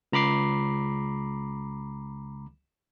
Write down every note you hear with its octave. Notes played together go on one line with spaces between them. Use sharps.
C#2 A#5 B5 D6 C7